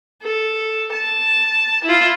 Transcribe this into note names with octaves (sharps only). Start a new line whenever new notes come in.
A4
A5
E4 F4